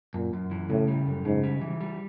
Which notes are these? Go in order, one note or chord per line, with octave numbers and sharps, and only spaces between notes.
F#2 A#2
F#2
E3
A2 C#3
G3
F#2
G#2 C#3
G3
E3
G3